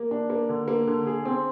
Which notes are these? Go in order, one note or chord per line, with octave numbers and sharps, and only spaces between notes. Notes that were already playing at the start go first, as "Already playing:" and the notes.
Already playing: A#3
D4
A#3
D3
A#3
D3
G#4
C4